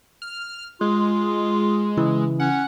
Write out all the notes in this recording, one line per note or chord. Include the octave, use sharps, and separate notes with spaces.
F6
G#3 F4
C#3 E3 E4
C#4 F#5